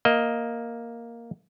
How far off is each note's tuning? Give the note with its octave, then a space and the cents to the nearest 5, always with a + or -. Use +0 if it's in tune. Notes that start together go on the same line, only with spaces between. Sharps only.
A#3 +0 D#5 +10